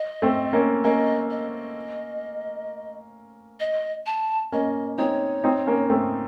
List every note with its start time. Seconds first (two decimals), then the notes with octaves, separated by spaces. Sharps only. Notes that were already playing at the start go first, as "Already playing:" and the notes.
Already playing: D#5
0.22 A3 C4
0.53 A#3 C#4
0.84 A#3 C#4 D#5
1.30 D#5
3.60 D#5
4.06 A5
4.52 A#3 C#4 D#5
4.98 C4 D#4 C#5
5.44 C4 D#4
5.67 A#3 C#4
5.90 A3 C4